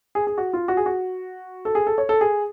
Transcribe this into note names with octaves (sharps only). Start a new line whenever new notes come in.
G#4
G#4
F#4
F4
F#4
G#4
F#4
A4
G#4
A4
C#5
A4
G#4